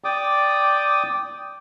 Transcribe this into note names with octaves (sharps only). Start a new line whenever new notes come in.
D5 G5 D6 D#6